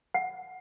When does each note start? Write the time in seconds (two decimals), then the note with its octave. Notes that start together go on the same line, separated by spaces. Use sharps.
0.14 F#5